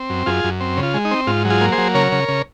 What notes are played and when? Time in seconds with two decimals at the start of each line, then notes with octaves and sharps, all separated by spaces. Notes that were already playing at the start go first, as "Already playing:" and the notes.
Already playing: C4
0.10 F#2
0.26 F#2 F4 G#4
0.44 F#2
0.60 C4
0.77 C#3
0.83 F4
0.94 G#3
1.05 D#4
1.11 C4
1.27 G#2 F4
1.45 F#3
1.50 F4 G#4
1.61 A#3
1.72 G#4 C5
1.78 F#3
1.94 C#3 A#4 C#5
2.12 C#3
2.28 C#3